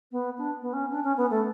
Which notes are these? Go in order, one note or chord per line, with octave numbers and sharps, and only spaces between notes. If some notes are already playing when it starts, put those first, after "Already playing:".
B3
D4
B3
C#4
D4
C#4
B3
A3